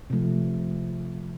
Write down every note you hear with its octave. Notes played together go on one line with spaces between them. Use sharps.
C3 F3 A3